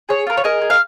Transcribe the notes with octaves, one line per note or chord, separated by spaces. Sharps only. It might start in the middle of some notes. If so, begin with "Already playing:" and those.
G#4 C#5
F4 A#4
C#5
G#4 A#4 D#5
G#4
F5